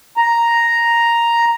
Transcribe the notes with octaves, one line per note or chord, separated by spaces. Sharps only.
A#5